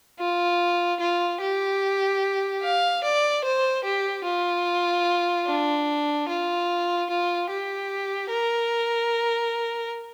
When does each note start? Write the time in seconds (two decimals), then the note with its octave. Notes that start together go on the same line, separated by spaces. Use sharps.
0.19 F4
1.00 F4
1.41 G4
2.62 F5
3.04 D5
3.44 C5
3.84 G4
4.25 F4
5.47 D4
6.28 F4
7.09 F4
7.50 G4
8.30 A#4